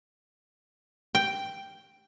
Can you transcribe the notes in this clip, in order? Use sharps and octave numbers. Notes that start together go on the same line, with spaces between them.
G5